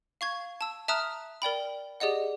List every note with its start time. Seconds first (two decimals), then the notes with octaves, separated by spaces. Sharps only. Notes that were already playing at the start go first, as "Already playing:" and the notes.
0.21 F5 C#6 G#6
0.61 A5 E6
0.88 E5 A5 A#5 D#6 F6 F#6
1.42 A#4 D5 G5 B5
2.00 G4 G#4 D5 D#5 F#5